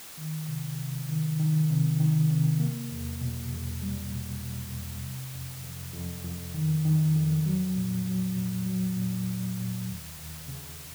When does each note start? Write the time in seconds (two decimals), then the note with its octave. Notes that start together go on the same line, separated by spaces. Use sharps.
0.17 D#3
0.48 C3
0.79 C3
1.09 D#3
1.40 D#3
1.70 C3
2.00 D#3
2.31 C3
2.60 A#3
2.91 E2
3.21 B2
3.52 E2
3.82 G3
4.12 B2
4.42 B2
4.73 E2
5.03 C3
5.34 F2
5.63 F2
5.94 F2
6.24 F2
6.54 D#3
6.85 D#3
7.16 F2
7.46 F#3
7.76 A#2
8.06 F#3
8.37 A#2
8.66 F#3
8.97 A#2
9.27 A#2
9.58 A#2
9.88 D#2
10.18 D#2
10.48 C#3